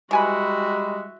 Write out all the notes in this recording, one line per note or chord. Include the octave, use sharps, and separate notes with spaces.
E3 G3 G#3 F#4 E5 G#5 B5